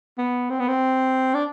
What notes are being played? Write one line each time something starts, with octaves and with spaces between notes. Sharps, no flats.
B3
C4
B3
C4
D4